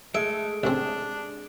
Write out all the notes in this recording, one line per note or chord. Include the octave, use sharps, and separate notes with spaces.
G#3 A3 E5 D7
A1 C4 D4